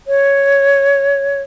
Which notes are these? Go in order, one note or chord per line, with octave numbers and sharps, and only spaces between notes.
C#5